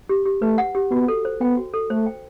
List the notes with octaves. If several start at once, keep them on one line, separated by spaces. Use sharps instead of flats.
G4
G4
A3 B4
F#5
G4
B3 F#4
A4
C5
B3 G5
F#4
A4
A3 C5
G5